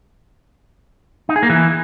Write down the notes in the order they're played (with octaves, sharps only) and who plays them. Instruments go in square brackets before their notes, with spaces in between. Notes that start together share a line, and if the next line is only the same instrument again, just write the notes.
[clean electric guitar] D#4
G#4
A#3
E3